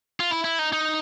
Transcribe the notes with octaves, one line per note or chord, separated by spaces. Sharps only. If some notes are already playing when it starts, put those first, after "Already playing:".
F4
E4
E4
D#4
D#4